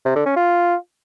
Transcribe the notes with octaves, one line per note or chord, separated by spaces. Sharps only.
C3
D3
C#4
F4